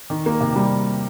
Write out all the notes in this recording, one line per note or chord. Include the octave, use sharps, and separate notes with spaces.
D#3
A#3
C3
G3